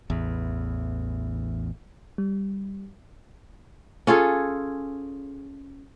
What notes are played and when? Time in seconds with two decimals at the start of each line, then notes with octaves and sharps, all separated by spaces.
0.10 A1 E2
2.18 G3
4.07 C#4 F4 G#4 A4